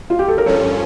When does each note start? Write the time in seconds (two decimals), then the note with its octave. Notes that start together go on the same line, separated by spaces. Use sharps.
0.10 F4
0.19 G4
0.28 A4
0.38 A#4
0.46 G2 F3 C#4 A4 C#5